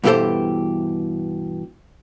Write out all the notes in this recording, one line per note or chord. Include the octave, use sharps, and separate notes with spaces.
G2 B2 E3 G4 A4 C5